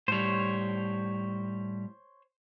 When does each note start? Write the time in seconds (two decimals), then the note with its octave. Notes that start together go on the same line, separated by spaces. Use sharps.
0.08 A2 G3 C5 C#5